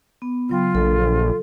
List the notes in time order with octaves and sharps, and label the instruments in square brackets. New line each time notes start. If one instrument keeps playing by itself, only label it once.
[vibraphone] B3
[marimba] C#3 F#3 G5 [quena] F4
[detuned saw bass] A#1 [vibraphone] A4